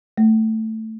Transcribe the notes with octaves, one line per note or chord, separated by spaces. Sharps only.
A3